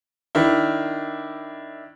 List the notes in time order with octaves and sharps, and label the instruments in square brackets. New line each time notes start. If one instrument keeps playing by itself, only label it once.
[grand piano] D#3 D4 E4